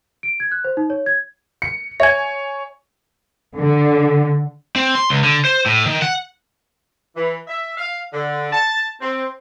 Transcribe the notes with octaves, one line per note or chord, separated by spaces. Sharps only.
D7
G#6
F#6
C5
D#4
C#5
G#6
C#7
C#5 E5 G#5 G#6
D3
C4
C6
C#2
D3
C5
A2
D#3
F#5
E3
E5
F5
D3
A5
C4